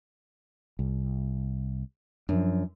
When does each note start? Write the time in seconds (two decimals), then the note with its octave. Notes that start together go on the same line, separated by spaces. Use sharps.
0.79 C2
2.29 F#2 F3 D4